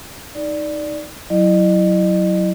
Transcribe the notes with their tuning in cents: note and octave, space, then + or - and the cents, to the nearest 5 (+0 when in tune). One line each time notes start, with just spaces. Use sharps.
D#4 +0 D5 +0
F#3 +0 E4 +0 D#5 -40